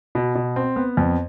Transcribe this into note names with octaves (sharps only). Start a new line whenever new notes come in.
B2
B2
C4
B3
F2